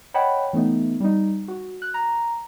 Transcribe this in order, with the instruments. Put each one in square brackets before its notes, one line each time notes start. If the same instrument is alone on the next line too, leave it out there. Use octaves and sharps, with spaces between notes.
[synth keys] C#5 D#5 F#5 G5 A5 B5
E3 A3 B3 D#4
G3 D#4
F#4
F#6
A#5